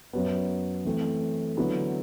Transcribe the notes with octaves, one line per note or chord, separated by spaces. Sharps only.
F#2 F#3 B3
E3 A3 C4
D3 F#3 B3 E4